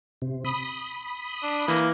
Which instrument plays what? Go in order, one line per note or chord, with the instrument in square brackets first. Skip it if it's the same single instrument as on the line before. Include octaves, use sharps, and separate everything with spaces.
[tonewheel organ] C3
B5 D#6
[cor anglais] D4
[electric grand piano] E3 [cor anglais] A#3